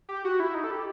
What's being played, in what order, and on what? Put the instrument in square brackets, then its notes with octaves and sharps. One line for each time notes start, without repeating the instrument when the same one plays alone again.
[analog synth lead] G4
F#4
E4
D#4
A4
G4